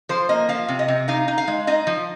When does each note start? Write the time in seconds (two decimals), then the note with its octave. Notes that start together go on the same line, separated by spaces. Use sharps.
0.09 F3 C5
0.29 A#3 D#5
0.49 F3 F5
0.68 C3
0.79 D#5
0.88 C3
1.08 D#4 F5
1.28 D#4
1.38 F5
1.48 G#3
1.67 D#4 D#5
1.87 F3